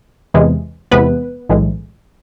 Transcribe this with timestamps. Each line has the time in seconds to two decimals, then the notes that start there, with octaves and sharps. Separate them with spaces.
0.34 E2 C3 E3 G#3
0.91 E2 C3 E3 G#3 B3 B4
1.49 B1 A2 E3 G#3